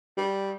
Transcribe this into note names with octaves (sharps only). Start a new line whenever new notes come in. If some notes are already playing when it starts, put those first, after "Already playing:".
G3